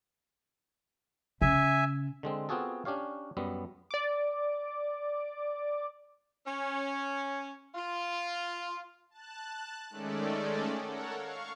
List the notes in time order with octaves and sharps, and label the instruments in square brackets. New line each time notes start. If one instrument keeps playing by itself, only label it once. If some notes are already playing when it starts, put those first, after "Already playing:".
[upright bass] C#3 [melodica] E5 G#5
[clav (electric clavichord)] D3 G#3 C4
B3 C4 F4 F#4 G#4 A4
C#4 D4 G4 C#5 F5
F#2 G3 B3
[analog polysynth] D5 D6
[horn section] C#4
F4
[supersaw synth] A5 F#6
D#3 G#3 A3 C#4 A4 D5
A4 A#4 C#5 F#5
F5 C#6